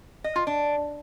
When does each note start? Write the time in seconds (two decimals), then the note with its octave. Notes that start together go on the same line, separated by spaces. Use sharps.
0.24 D#5
0.36 F4
0.47 D4